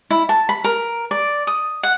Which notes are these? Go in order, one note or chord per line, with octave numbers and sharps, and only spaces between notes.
E4
A5
B5
A#4
D5
D#6
F#5